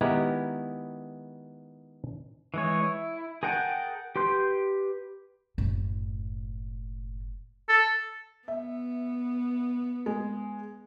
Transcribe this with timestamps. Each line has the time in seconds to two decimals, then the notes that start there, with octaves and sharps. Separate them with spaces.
0.01 D#3 G#3 B3 E4 G4 A#5
2.54 E3 G#3 C#5
2.83 E4
3.43 G#4 A#4 F#5 G5 A5
4.16 G4 B4 C6 G6
5.58 F#1 A2
7.69 A4
8.48 B3 E5
10.06 G#3